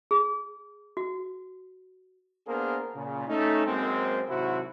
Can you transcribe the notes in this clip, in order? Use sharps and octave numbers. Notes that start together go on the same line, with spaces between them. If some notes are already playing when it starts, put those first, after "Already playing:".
G#4
F#4
A#3 B3 D4 G#4 A#4 C5
A#2 C#3
A3 C#4 D#4
F#2 G#3 A#3 C4
G#1 C3 F#3 E4 F#4 C5